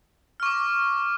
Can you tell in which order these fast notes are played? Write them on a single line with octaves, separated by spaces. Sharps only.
F6 C#6 D6